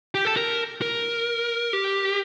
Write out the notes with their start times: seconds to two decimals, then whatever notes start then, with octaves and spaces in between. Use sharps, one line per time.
0.15 G4
0.25 A4
0.36 A#4
0.82 A#4
1.73 G4